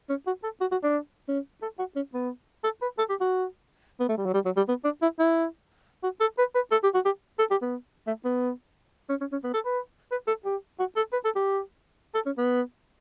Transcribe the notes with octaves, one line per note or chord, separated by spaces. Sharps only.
C#4
F#4
A4
F#4
F#4
D4
C#4
A4
F#4
C#4
B3
A4
B4
A4
G4
F#4
B3
A3
G3
F#3
G3
F#3
G3
B3
D4
E4
E4
F#4
A4
B4
B4
A4
G4
F#4
G4
A4
G4
B3
A3
B3
C#4
C#4
C#4
B3
A4
B4
B4
A4
G4
F#4
A4
B4
A4
G4
A4
C#4
B3